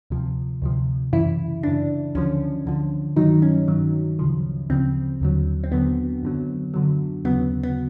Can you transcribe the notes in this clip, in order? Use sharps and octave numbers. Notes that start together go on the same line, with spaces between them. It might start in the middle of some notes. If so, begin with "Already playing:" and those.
D2 C3 F3
D2 C3 F3
F#2 C#3 E3 E4
F#2 C#3 E3 D4
D2 D3 F3 C#4
D2 D3 F3
G2 D#3 F#3 D#4
C#4
G2 D#3 F#3
D2 C#3 F3
D2 C#3 F3 C4
D#2 D3 F#3
C4
D#2 D3 F#3 B3
F#2 D3 F#3
F#2 D3 F#3
D#2 C#3 F#3 B3
B3